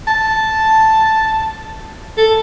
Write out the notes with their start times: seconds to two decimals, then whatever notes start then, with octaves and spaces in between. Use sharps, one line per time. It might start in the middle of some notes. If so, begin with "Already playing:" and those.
0.07 A5
2.18 A4